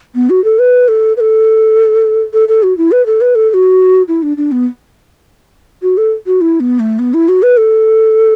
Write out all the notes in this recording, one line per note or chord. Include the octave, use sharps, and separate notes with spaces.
B3
F#4
A4
B4
A4
B4
A4
A4
A4
F#4
E4
B4
A4
B4
A4
A4
F#4
E4
D4
D4
B3
F#4
A4
F#4
E4
B3
A3
B3
E4
F#4
B4
A4